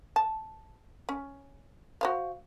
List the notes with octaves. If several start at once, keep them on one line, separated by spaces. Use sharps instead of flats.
A5
C#4
F#4 C5 F5